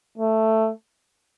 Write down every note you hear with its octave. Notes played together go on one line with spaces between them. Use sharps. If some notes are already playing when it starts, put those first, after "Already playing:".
A3